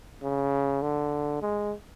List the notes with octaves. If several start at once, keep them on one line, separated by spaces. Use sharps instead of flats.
C#3
D3
G#3